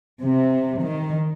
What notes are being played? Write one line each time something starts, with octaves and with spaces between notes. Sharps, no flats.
C3
D#3